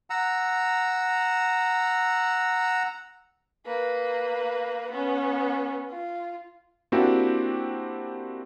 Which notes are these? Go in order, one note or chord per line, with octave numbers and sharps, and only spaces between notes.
F#5 A#5 E6
A#3 B4
B3 C#4
F4
A#3 C4 D4 E4 F#4 G4